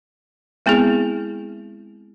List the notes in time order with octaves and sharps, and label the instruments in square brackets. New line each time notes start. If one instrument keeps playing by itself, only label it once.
[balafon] G#3 B3 C4 E4 G#4